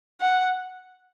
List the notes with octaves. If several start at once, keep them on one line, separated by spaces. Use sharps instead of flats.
F#5